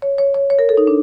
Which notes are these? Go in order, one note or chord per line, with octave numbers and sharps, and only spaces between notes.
C#5
C#5
C#5
C#5
A#4
A4
D#4
D4